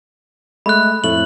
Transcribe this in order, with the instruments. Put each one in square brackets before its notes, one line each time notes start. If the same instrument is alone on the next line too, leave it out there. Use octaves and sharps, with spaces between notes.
[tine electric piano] G#3 A3 [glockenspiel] B5 F#6
[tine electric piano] F2 A2 A3 [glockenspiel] F#7